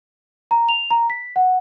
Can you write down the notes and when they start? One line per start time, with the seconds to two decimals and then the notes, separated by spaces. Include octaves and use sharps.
0.51 A#5
0.69 F7
0.91 A#5
1.10 B6
1.36 F#5